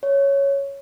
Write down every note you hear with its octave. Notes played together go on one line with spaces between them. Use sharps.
C#5